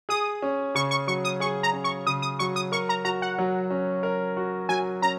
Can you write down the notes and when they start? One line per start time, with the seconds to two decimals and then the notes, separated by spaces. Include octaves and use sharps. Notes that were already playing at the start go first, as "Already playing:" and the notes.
0.09 G#4 D#6
0.42 C#4
0.75 C#3 C#6
0.91 C#6
1.07 F#3 C#6
1.25 D#6
1.40 G#4 C#6
1.63 A#5
1.73 C#4
1.84 C#6
2.07 C#3 D#6
2.22 D#6
2.39 F#3 C#6
2.56 D#6
2.72 A#4 C#6
2.89 A#5
3.04 F#4 A#5
3.22 F#5
3.39 F#3
3.71 C#4
4.03 A#4
4.37 F#4
4.69 F#3 G#5
5.02 C#4 A#5